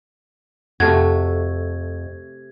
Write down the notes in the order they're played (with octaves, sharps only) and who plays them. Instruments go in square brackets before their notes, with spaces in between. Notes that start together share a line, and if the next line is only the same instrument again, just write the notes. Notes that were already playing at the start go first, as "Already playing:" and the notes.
[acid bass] F2 [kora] C3 A3 F#4 [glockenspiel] G#6